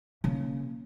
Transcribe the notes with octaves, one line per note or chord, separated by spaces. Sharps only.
C#3 A#3